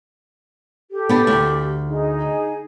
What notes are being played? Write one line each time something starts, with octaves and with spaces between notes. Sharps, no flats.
G4 A4
B3 D4
D2
D#4 G#4